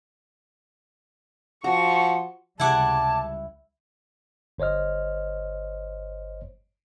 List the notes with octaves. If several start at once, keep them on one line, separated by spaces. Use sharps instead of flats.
F3 F#4 C#6
C#2 C3 G3 E4 F#5 A5 D6 G#6
G1 C5 C#5 D#5 F6